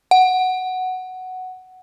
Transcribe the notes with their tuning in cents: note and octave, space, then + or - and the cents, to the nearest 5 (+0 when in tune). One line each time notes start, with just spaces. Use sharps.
F#5 +5